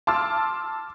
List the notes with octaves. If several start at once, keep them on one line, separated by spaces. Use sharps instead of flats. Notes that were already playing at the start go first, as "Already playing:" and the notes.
A5 C6 D6 E6 F6 A6